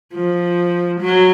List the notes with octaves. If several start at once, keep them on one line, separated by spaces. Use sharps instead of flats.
F3
F#3